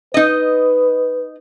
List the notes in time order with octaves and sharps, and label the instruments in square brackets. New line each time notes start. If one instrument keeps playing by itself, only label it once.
[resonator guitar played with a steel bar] D#4 D#5 [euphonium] B4